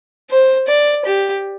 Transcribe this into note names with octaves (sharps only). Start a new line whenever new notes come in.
C5
D5
G4